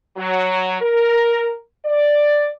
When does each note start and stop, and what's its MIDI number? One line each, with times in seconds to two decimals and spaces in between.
0.17 0.76 54
0.81 1.55 70
1.85 2.48 74